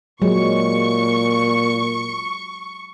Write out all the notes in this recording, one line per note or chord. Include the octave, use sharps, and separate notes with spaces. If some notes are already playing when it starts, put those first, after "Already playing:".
A#2 F#3 G#3 C#6